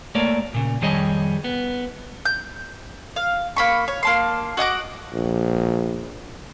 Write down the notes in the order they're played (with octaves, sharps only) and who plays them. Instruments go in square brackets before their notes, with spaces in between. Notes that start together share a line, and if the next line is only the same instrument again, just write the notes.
[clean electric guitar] A3 A#3 C#5 D5
A#2 C#3
F2 D#3 G3 G#4 C#5 D#5
B3
[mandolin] G6
F5
A#3 B5 C#6
C#5
A#3 A5 C6
F#4 D#5 F#5 D6
[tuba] A#1